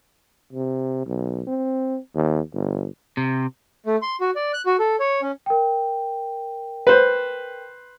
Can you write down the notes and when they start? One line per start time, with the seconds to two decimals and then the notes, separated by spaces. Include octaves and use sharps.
0.53 C3
1.06 B1
1.48 C4
2.15 D#2
2.53 G1
3.17 C3
3.86 A3
4.02 C6
4.21 F#4
4.36 D5
4.54 F#6
4.66 F#4
4.79 A4
5.00 C#5
5.22 C#4
5.46 A#4 G5
6.87 B4 C5